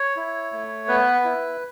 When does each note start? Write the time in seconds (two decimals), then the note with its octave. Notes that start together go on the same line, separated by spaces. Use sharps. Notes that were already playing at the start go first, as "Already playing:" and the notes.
Already playing: C#5
0.16 E4
0.52 A3
0.88 B3 B4
1.25 E4